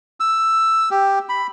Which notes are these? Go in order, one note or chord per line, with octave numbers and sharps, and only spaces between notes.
E6
G4
B5